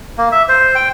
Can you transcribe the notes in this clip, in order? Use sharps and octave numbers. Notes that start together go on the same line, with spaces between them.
A#3
E5
C5
G5